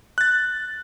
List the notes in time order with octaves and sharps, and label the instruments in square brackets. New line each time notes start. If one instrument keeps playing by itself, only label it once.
[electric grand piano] F#6 A6